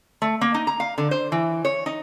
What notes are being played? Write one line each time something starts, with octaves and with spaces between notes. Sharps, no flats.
A3
A#3
D#4
A#5
F5
D3
C5
E3
C#5
D#4